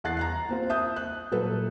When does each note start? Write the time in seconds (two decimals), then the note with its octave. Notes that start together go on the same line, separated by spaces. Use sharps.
0.04 E2 F#5 F#6 A6 C7
0.17 A#5 F#6 C7
0.49 A#3 C4 F4
0.70 E5 D#6 G6
0.96 F#6
1.31 A#2 F#3 A4 B4